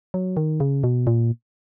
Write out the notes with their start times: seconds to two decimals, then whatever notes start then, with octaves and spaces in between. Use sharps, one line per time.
0.14 F#3
0.37 D#3
0.60 C#3
0.84 B2
1.07 A#2